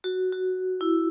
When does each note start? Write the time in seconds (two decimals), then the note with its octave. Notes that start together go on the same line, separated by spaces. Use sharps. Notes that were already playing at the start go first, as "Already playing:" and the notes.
0.04 F#4
0.33 F#4
0.81 E4